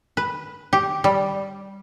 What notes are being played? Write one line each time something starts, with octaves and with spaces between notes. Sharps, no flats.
B4
G4
G3